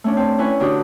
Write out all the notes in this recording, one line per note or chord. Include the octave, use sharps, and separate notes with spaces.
A3 C#4 D4
C4
C#4 E4 B4 G#5 C#6
D3 D4 F#4 G4 D#6